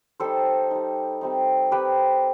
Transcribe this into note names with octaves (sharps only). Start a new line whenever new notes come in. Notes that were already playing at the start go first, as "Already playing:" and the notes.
G3 D#4 A4 C5
G3 D#4
G3 C4 D#4
G3 C4 D#4 G4 B4